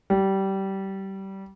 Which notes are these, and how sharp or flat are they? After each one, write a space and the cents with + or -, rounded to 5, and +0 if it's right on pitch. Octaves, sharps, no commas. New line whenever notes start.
G3 -20